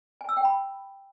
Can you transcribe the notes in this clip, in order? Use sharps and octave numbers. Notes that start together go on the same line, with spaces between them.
G#5
E6
G5
B5